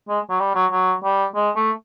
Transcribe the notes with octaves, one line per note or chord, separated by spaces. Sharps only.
G#3
F#3
G3
F#3
F#3
G3
G#3
A3